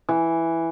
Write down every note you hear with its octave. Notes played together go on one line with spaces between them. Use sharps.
E3